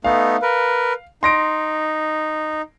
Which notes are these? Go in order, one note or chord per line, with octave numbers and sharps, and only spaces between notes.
A3 B3 D#4 F5
A#4 B4
D#4 C6 A#6 D7